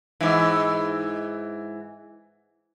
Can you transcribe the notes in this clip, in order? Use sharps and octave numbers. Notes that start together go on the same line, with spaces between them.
G#2 E3